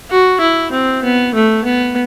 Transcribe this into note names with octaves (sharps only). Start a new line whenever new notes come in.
F#4
E4
C4
B3
A3
B3